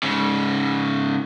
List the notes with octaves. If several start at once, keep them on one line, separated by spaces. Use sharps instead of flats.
G#2 C#3